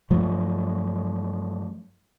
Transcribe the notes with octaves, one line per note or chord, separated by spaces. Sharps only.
G2 F3 F#3 A3